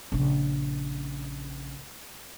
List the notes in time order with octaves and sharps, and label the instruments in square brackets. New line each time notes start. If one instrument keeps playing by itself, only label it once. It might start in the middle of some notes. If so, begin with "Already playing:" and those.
[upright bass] A#1 C#3